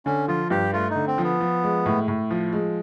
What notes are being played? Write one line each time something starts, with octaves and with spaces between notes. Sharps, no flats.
D3 C#4
F3 F4
G2 G4
A3 F4
D#4
D3
C4
F3
B3
F3
G#3
A2
A2
F3
G#3